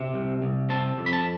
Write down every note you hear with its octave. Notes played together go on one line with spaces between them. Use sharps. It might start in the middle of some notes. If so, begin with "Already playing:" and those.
Already playing: C3
C2
C2
C4 A5
F2
B5
A5